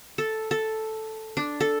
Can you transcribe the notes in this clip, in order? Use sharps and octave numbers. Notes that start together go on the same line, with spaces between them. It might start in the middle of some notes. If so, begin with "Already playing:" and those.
A4
A4
D4
A4